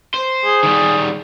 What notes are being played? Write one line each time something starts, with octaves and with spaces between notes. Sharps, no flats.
C5
G#4
D#3 G3